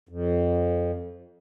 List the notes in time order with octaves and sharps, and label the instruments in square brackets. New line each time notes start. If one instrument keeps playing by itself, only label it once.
[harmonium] F2